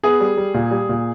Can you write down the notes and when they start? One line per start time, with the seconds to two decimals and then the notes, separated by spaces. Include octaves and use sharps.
0.04 B3 G#4
0.20 G3
0.37 G3
0.54 A#2
0.71 G3
0.89 A#2